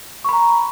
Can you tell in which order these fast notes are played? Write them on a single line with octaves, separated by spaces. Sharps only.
C#6 B5 A#5